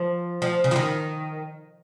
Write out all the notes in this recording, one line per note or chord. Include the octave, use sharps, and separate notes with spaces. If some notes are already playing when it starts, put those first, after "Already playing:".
Already playing: F3
F3
C#3
F3
D#3